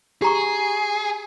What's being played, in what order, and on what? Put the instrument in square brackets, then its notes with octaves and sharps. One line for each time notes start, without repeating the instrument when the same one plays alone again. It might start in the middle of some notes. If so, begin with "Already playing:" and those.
[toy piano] G4 A#5 C#6 [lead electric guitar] G#4